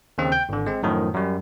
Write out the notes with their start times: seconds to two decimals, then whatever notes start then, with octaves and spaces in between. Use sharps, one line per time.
0.18 D#2 C#3 C4
0.32 G5 G6
0.49 G#1 D3
0.66 G#3 C4
0.83 F#2 A2 D#3 F3
1.14 F#2 G3